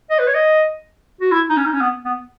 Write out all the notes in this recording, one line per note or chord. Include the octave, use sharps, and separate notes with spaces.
D#5
B4
C#5
D#5
F#4
E4
D#4
C#4
D#4
C#4
B3
B3